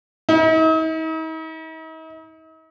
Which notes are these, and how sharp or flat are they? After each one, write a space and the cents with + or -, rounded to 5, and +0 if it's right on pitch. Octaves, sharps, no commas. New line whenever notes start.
D#4 +45